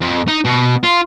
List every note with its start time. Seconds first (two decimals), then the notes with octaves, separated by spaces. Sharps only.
0.01 F2
0.28 D#4
0.44 B2
0.84 F4